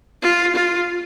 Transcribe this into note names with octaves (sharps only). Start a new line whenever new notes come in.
F4
F4